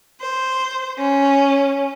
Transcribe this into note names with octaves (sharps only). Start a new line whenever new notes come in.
C5
C#4